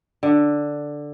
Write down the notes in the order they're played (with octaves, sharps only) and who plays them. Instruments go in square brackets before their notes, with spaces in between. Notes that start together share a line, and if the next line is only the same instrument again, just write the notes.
[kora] D3